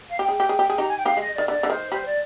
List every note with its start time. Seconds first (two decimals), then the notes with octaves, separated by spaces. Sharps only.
0.09 F5
0.19 G4 G5
0.29 G#4
0.40 G4
0.49 G#4
0.59 G4
0.70 G#4
0.78 D#4 G4 A#5
0.88 G#5
0.97 G5
1.05 D#4 G4 F5
1.17 G#3 D#5
1.35 D#3 D5
1.48 D3 D5
1.63 D3
1.70 D#3 C5
1.92 G3 C5
2.05 D5